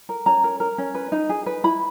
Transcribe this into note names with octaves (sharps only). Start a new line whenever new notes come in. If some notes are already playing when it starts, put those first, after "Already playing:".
A#4
C#4 A#5
A#4
A#4
C#4
B4
D#4
G#4
B4
E4 B5